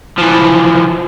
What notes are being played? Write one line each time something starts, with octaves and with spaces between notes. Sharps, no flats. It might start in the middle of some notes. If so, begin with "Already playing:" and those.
E3 F3